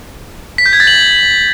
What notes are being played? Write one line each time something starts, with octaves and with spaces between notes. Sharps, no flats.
B6
G6
G#6
A6
F#7